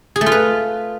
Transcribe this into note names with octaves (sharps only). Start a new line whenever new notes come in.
G#4
A3
F4
B4